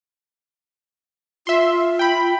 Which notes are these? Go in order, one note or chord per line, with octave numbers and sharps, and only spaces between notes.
F4 E5 C6
G5 B5